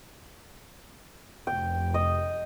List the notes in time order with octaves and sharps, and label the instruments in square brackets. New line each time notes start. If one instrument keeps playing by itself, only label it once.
[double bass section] F1 [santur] G5
[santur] D#5